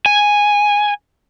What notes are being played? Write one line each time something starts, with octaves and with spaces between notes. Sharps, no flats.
G#5